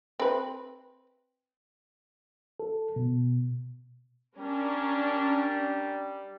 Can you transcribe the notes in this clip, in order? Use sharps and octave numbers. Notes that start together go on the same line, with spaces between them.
C4 B4
A4
B2
G3 C#4 D4 A#4